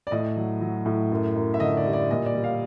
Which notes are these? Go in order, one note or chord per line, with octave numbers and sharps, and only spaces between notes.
D5
A2 D#5
F#3
F#3
A2
F#2
F#2
E5
D3 D#5
D5
G3
D5
A#2 D#5
D5
G3
F5